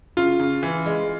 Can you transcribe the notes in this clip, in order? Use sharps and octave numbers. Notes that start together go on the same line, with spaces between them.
C#3 F4
C#3
E3
G#3